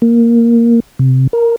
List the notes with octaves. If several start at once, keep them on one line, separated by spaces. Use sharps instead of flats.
A#3
C3
A#4